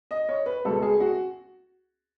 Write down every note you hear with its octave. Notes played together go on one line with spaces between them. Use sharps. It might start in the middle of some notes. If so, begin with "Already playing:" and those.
D#5
C#5
B4
C#2 B2 A4
G#4
F#4